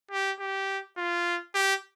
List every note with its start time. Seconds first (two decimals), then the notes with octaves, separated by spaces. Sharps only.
0.11 G4
0.40 G4
0.97 F4
1.54 G4